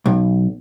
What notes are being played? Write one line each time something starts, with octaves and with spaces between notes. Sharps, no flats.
B1